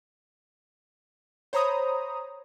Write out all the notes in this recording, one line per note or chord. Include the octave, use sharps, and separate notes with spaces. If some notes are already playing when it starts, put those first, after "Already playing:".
C5 C#5 A#5 B5 D#6